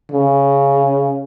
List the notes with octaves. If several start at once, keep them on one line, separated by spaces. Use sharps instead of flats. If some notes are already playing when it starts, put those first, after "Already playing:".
C#3